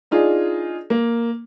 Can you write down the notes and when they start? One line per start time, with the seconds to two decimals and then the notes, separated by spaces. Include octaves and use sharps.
0.11 D4 D#4 F4 G#4
0.90 A#3